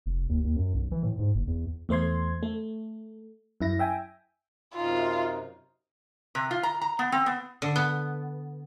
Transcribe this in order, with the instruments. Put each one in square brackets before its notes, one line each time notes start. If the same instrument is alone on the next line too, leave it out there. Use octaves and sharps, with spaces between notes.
[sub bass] F1
D#2
D#2
F#2
B1
E3
A2
G#2
F#1
E2
[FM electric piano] E2 A3 C5 C6 G#6
A3
F#2 E4 A#6
E5 G5 G#5
[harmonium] F#2 C3 D#4 [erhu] F4
[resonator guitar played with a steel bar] C3
F4
A#5
A#5
B3
C4
B3
[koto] D3
B3